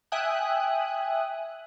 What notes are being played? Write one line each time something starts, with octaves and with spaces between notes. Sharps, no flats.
E5 G5 G#5 D#6 F#6